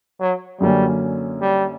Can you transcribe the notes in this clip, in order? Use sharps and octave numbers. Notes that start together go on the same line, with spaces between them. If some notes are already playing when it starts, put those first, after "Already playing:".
F#3
F#2 D3 F#3 G3 A#3 C#4
G3